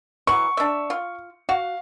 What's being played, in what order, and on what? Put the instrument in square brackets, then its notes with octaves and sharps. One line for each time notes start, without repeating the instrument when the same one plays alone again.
[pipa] E3 F#3 [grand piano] C#6
[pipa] D4 E5
F4
[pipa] F#4 [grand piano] F5